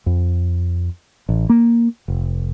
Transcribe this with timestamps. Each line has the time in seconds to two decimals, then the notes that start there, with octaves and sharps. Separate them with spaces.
0.06 F2
1.29 A1
1.49 A#3
2.08 F1